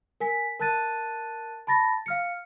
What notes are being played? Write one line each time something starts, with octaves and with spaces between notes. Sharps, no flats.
A#4 G#5 B6
A#4 A5 F#6 A6 D#7
A5 B5 A6 A#6
F5 F6 C#7